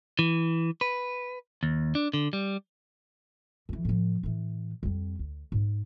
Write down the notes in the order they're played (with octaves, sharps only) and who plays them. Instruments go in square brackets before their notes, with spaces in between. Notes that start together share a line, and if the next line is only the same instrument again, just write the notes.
[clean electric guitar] E3
B4
D#2
D4
D3
G3
[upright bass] F2 E3
A2 F3
A2 E3
F2 G3
D2
G#2 B3